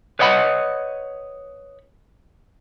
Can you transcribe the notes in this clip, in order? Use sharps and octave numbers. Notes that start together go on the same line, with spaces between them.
B4 C#5 D#5 F#5 B5